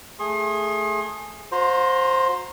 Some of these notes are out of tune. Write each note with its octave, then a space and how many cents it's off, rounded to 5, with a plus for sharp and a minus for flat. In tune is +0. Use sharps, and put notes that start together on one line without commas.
A3 +0 G#4 +0 C6 +40
F#4 -45 C5 +5 A#5 +0